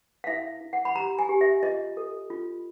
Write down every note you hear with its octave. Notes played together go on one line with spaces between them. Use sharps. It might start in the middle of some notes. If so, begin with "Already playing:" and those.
F5
E4 E5
E4
F#5
B5
G4 A#5
G#5
G4
E5
F4 D#5
A4
F4